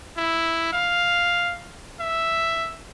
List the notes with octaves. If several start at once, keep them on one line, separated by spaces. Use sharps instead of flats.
E4
F5
E5